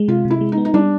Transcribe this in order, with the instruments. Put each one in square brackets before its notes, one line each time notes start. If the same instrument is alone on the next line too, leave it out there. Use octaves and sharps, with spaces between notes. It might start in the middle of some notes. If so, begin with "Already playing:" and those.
Already playing: [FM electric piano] G#3
[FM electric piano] C3 [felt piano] F4
[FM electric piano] C3
[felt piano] E4
[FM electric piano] G#3
[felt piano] D#4
[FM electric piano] B3
[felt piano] D#4
[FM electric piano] G3 [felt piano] D4